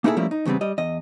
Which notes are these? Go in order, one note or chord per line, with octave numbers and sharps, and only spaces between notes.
A#3 D#4 E4 F#4 G#4 A4
F3 G3 A3 A#3 C#4 E4
D#4
E2 C#3 G3 B3 C4
G3 D#5
E2 D#5